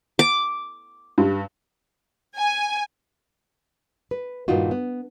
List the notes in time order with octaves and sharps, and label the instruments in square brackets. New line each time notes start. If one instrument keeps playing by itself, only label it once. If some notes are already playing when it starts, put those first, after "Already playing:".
[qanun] D6
[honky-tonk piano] G2
[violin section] G#5
[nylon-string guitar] B4
G2 A#2 D#3 D#4 F4 F#4
B3